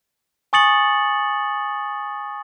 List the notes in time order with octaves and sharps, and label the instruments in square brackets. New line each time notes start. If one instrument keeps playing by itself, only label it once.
[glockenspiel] G#5 C#6 D#6 A6 C#7 F#7